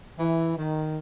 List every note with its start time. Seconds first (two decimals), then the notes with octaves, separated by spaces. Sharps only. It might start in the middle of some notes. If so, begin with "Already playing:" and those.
0.18 E3
0.56 D#3